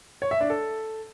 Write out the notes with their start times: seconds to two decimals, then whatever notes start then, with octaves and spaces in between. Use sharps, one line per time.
0.22 C#5
0.31 E5
0.41 D4
0.50 A4